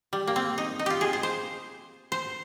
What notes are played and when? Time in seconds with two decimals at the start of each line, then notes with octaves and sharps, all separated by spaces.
0.13 G3
0.27 A#3
0.36 C4
0.58 D#4
0.79 D#4
0.86 F4 G4
1.01 G#4
1.13 C5
1.23 C5
2.12 C5